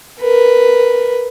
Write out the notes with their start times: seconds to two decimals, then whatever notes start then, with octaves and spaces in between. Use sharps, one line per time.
0.21 A#4 B4